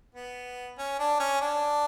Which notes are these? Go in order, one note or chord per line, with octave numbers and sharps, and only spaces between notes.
B3
C#4
D4
C#4
D4